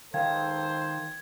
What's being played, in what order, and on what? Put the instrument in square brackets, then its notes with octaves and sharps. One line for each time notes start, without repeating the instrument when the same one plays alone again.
[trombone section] C#2 A4 C5 [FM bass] D#3 [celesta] F5 G5 [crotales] G#6